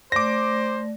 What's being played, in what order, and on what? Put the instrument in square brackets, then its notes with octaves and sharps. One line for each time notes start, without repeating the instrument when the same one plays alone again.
[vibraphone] A3 D5 [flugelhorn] C5 [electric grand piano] D6 A#6